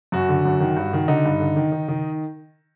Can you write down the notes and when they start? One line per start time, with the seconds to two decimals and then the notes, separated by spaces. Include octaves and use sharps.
0.12 F#2 F#4
0.29 D3
0.45 F#2
0.61 D#3
0.77 G2
0.93 D#3
1.08 D3 D#4
1.25 G2
1.40 D3
1.56 D#3
1.72 D#3
1.88 D#3